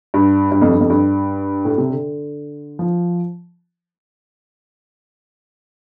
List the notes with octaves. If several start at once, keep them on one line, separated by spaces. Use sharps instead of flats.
G2
G2
F2
G2
F2
G2
A2
C3
D3
F3